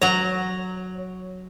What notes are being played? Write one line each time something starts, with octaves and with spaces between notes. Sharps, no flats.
F#3 C#5 A#5